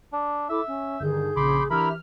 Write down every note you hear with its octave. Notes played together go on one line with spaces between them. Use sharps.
D4
E4 A4 E5 D6
C#4
G2 D3 D#3 G#4 G6
A#1 C#3 B5 C6 D6
E3 D4 E4 G4 A#4 E5 B5 F6